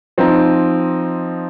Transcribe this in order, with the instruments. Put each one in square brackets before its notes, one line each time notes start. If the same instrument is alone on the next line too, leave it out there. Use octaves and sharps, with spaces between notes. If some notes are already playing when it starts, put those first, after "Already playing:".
[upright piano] F3 C4 D#4